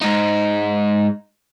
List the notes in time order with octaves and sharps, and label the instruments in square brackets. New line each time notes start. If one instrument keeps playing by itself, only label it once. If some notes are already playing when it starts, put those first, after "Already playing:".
[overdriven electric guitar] G#2 D#4